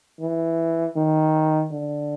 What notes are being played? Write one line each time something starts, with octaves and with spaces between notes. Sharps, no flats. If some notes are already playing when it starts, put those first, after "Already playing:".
E3
D#3
D3